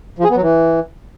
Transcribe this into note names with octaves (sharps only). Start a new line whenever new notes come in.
F3
G#4
B3
F#3
E3